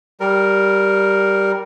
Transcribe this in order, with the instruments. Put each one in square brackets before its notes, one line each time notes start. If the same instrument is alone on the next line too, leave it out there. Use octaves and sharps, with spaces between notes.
[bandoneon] G3 A#4